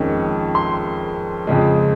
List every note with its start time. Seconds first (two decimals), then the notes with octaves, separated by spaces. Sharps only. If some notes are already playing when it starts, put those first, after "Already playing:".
Already playing: F2 D#3 G#3 C#4
0.55 C6
1.47 F2 C#3 G#3